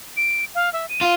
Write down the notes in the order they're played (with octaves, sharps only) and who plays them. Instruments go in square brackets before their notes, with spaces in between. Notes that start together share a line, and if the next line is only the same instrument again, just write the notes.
[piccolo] D7
F5
E5
D#7
[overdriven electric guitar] F4